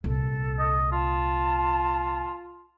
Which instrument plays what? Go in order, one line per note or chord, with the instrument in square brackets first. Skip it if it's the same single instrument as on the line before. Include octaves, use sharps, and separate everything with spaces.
[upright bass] C2 A#2 [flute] A4
[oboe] D#5
[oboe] F4 [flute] A5